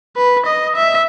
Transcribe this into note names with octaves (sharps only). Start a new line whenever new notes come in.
B4
D#5
E5